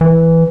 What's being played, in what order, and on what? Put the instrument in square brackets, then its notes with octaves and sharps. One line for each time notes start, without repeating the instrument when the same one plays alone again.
[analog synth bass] E3